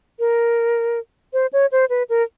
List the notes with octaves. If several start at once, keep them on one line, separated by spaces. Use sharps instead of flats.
A#4
C5
C#5
C5
B4
A#4